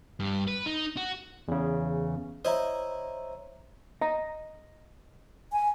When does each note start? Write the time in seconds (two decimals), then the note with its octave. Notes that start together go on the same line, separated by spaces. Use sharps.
0.20 G2
0.48 B4
0.66 D#4
0.97 F#4
1.48 E2 C#3
2.45 E4 C5 C#5 D#5 A#5
4.01 D#5 A#5
5.52 G#5